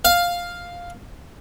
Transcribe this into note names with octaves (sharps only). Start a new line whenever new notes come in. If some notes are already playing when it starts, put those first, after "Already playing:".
F5